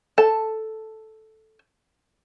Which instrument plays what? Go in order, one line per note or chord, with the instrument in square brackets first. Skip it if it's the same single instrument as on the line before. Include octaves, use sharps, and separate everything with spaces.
[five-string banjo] A4 A5